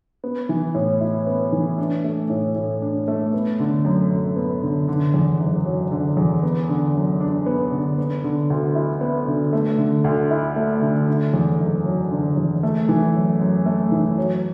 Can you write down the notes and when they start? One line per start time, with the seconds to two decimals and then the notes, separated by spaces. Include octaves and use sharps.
0.24 B3
0.49 E3
0.74 A2
1.01 E4
1.27 B3
1.52 E3
1.78 D4
2.04 A3
2.30 A2
2.56 A2
2.82 D4
3.08 A3
3.34 B3
3.60 D3
3.85 F#2
4.11 F#2
4.36 B3
4.62 D3
4.88 D3
5.14 E2
5.40 F#1
5.65 F#3
5.92 D3
6.17 E2
6.43 B3
6.69 D3
6.95 F#2
7.20 D4
7.46 B3
7.72 D3
7.98 B3
8.24 D3
8.50 D2
8.75 E4
9.01 B3
9.28 D3
9.53 A3
9.78 D3
10.04 D2
10.31 E4
10.56 A3
10.82 D3
11.08 D3
11.34 E2
11.60 F#1
11.85 F#3
12.11 D3
12.37 E2
12.63 A3
12.89 E3
13.14 F#2
13.40 F#2
13.66 A3
13.92 E3
14.18 F#3